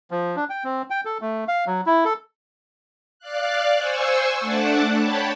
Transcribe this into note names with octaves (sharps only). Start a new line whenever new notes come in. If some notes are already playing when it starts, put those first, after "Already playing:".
F3
D4
G5
C4
G5
A4
A3
F5
F#3
E4
A4
D5 F5 F#6
C5 G#5 C#6 E6
A3 D4 F#5 A5 D6
C#5 G5 A5 B5